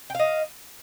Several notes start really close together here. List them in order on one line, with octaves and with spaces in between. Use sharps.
G5 F5 D#5